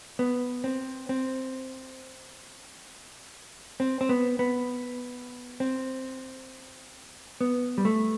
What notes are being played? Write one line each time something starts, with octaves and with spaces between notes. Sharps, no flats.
B3
C4
C4
C4
C4
B3
B3
C4
B3
G3
A3